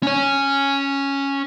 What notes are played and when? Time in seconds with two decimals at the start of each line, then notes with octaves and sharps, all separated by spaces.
0.03 C#4 C#5